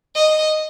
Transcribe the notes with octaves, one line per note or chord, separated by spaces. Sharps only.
D#5